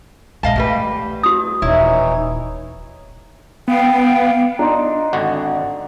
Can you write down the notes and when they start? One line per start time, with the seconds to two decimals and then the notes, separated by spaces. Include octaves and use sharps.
0.43 A#1 G#2 D#5 F5 A5
0.56 E2 G3 A3 B4
1.23 F#4 D#6
1.62 D#1 E3 D#4 E4 C#5
3.68 B3 F5 G5
4.59 D4 D#4 A#5 C6
5.13 G#1 D3 F#4
5.39 F#5